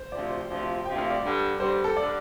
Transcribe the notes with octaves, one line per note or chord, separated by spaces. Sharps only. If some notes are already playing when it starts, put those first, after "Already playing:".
Already playing: C5
D2 C3 F3 D5
D2 C3 F3
D2 C3 F3 G5
F5
D5
G2 D3 G3
G2 D3 G3 C5
A4
D3 G3 D5